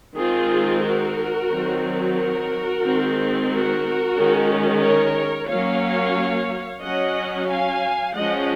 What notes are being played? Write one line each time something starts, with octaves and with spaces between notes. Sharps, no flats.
D#3 G#3 C4 F4 G#4
F#4 A#4
D#3 F#3 C4
F#4 A#4
D#3 G#3 C4
F#4 A#4
D#3 G#3 C#4
A#4 C#5
F#3 A#3 C#4 C#5 F5
F#3 C#4 D#5 F#5
F5 G#5
F3 G#3 C#4 D#5 F#5